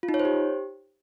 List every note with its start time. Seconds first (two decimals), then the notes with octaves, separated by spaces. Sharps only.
0.03 F4
0.09 D#4
0.14 C#5
0.20 C5
0.25 G4